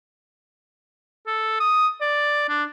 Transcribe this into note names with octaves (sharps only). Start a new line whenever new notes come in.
A4
D#6
D5
D4